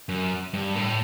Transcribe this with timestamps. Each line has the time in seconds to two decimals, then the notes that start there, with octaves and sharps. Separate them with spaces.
0.09 F#2
0.54 G2
0.75 A2